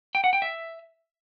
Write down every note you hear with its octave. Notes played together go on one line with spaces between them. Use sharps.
G5
F#5
G5
E5